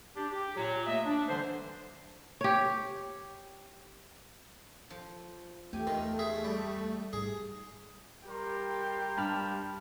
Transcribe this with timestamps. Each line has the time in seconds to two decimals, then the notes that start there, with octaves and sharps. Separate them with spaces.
0.16 D4 G4
0.33 G4
0.56 A#2 F#3
0.86 A3 A#3 D#5 E5
1.05 D4
1.28 D3 E3 G3 C5
2.41 G4 C#5
4.90 F3
5.73 E2 A3 G4 G#5
5.87 D#3 F4
6.19 G#4 E5
6.45 G3
7.13 G#2 G3 G#4
8.28 G3 G4 A#4 C6
9.17 G2 A5 B5 F6